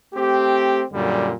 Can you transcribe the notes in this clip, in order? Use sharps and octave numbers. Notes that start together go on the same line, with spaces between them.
A3 C4 G4
F#2 A#2 D3 G3